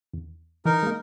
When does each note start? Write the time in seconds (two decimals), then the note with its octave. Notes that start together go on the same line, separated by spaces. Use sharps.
0.13 E2
0.65 E3 D#4 A#4
0.83 G#3 A#3